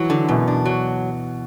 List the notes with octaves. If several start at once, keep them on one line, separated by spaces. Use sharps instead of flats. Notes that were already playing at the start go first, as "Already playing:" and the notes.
Already playing: E3 F#3
D3
F#2 B2
D4
F#3